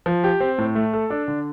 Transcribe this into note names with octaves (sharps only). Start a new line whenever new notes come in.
F3
G4
C4
A2
A3
A4
D4
D3